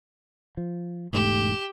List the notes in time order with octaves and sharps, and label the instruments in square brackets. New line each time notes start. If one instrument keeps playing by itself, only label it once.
[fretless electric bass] F3
[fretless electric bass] E1 G#2 A3 [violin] G4 E7